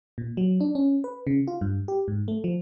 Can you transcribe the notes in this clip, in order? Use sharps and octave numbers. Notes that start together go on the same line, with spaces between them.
A#2
F#3
D4
C#4
B4
C#3
F4
G2
G4
G#2
A3
F3